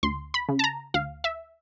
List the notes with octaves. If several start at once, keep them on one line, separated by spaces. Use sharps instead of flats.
D2 C6
B5
C#3
A5
A#5
D2 F5
E5